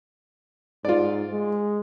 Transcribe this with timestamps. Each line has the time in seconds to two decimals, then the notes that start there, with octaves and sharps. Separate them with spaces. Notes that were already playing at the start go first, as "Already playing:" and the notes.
0.85 G#2 F4 D5
1.32 G#3